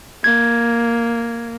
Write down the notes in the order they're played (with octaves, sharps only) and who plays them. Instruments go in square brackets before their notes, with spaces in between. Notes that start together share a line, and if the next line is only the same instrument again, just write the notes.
[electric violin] A#3 [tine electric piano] G#6